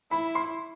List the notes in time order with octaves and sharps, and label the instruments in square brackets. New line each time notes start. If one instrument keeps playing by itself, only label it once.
[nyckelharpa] E4 [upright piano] B5
[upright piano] C6